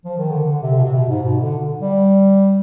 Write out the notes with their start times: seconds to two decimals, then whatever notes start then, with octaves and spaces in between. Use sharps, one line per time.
0.05 F3
0.18 D#3
0.30 D3
0.44 D3
0.63 C3
0.78 B2
0.84 C3
0.96 B2
1.09 G#2
1.22 B2
1.42 D3
1.81 G3